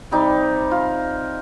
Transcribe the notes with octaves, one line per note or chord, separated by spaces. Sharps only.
C3 G3 D#4
F4